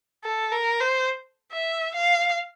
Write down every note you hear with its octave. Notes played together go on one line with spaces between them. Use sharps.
A4
A#4
C5
E5
F5